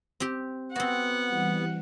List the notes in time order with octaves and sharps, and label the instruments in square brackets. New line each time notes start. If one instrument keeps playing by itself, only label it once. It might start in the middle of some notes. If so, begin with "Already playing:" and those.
[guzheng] C4 G4
[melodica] B3 [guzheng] C4 F#4 [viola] F#5
[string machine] E3 G3